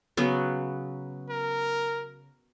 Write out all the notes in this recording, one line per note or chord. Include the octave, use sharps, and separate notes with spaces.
C#3 F#3 B3
A#4